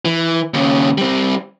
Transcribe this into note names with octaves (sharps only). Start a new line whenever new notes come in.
E3
D#2 C#3
G3 C4